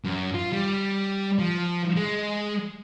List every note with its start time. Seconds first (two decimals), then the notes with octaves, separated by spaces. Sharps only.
0.04 F#2
0.34 F4
0.53 G3
1.39 F3
1.97 G#3